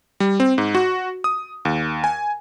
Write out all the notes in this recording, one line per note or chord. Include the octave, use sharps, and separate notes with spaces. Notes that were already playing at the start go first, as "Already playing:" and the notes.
G3
C4
G#2
F#4
D#6
D#2
G#5